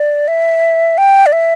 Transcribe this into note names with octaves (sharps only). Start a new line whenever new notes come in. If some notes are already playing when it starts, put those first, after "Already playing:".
Already playing: D5
E5
G5
D5
E5